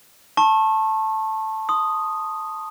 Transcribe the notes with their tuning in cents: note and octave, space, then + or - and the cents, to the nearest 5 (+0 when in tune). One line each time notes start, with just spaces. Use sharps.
A5 +0 C#6 -35 E6 +20
C6 -5 D#6 -5